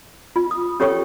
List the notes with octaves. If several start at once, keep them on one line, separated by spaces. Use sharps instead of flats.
F4
D#6
C#4 G4 A4 C#5 G5 C#6